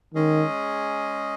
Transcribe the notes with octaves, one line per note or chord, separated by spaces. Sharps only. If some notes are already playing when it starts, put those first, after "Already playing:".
D#3 G#3 C#4 G#4 D#5